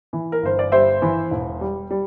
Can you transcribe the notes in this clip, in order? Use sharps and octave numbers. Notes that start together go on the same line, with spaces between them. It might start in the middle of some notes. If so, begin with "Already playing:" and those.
E3
A#4
G1 C5
D5
G3 C5 E5
E3
E1
G3
G3